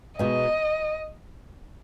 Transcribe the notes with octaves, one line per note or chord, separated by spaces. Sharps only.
B2 G#3 D#4 D#5